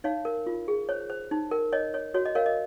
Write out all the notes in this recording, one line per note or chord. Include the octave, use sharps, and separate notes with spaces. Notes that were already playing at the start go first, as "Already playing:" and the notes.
D#4 C#5 F5
A#4
F4
G#4
C5 C#5
C5
D#4
A#4
C#5 D#5
C#5
F#4 C#5
D#5
A#4 C#5 F5
D#5